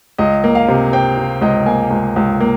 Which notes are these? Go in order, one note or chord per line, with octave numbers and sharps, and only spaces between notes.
C#2 D#5
A#3
F5
C3
C3 G5
C3
C#2 D#5
A#3 G#5
C#2
C#2
A#3